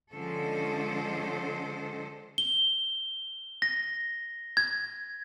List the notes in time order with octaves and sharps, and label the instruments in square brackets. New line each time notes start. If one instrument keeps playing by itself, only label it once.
[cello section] D3 F3 G#3 C#4 A4 C5
[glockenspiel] G7
A#6
G#6